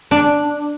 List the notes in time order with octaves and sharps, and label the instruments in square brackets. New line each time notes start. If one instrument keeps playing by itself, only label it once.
[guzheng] D4